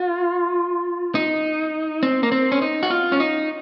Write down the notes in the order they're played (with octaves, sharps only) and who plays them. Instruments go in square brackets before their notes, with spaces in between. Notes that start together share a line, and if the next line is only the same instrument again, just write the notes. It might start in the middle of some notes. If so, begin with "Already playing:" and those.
Already playing: [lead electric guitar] F4
D#4
C4
A#3
C4
C#4
D#4
F#4
F4
C#4
D#4